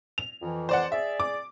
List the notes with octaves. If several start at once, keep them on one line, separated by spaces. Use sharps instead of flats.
F7
F2 E3
C5 D5 F#5
G#4 D5 E5
D6